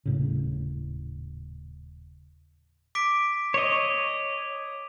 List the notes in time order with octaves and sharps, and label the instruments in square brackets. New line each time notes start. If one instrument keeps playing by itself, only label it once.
[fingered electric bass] D#1 A2 C#3
[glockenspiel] D6 B6 D7
[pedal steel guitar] C#5 D#5